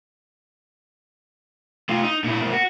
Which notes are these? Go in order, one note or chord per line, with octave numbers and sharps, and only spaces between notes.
A3 F4
D#4
A#2 E4
G#2 A#3
F#4